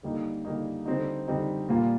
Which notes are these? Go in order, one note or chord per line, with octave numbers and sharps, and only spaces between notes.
D3 G3 A#3 D#4
D3 G3 A#3 D#4
D3 G3 C4 D#4
D3 G3 C4 D#4
A#2 G3 A#3 F4